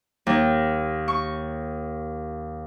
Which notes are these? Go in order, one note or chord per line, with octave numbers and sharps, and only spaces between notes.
D#2
C#6